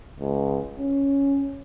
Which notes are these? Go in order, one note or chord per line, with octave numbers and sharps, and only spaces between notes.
C#2
C#4